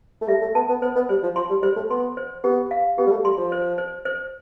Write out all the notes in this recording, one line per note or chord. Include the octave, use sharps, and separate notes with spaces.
A3
G3 E5
A3
B3 A5
B3
B3 C5
B3
G3 C5
F3
F3 C6
G3
G3 C5
A3
B3 C6
C5
B3 G4
F5
B3 G4
G3
A3
G3 C6
F3
C5
C5
C5